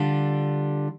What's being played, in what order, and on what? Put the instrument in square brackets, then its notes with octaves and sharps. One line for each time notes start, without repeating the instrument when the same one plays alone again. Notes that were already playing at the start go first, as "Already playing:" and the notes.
Already playing: [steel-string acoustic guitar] D3 G3 D4 F4